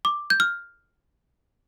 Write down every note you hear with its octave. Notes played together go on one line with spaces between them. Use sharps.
D6
G6
F6